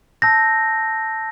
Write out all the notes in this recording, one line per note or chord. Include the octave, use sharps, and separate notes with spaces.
A5 E6 G6 A#6